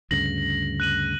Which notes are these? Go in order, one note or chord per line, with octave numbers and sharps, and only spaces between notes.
D2 G2 C#3 A#6 F#7
F#6 D#7 F#7